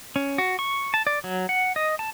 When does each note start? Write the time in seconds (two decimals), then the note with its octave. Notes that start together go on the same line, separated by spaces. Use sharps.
0.16 C#4
0.38 F#4
0.59 C#6
0.94 A5
1.07 D5
1.24 F#3
1.49 F#5
1.76 D#5
1.99 A5